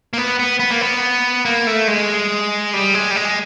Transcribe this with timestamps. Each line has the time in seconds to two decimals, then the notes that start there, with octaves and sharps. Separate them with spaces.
0.13 A#3
0.18 B3
0.40 B3
0.60 B3
0.70 A#3
0.81 B3
1.45 A#3
1.67 A3
1.88 G#3
2.73 G3
2.94 G#3
3.11 G3
3.16 G#3